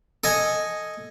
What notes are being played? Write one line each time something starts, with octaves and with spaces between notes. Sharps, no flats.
A4 D#5 G#5